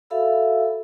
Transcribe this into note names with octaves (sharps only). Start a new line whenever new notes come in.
F#4 A4 E5 F5 B5 E6